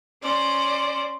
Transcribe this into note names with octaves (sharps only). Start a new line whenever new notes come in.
C#4 C5 D5